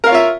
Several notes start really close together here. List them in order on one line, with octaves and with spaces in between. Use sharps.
A#4 F5 C#5 F4 E5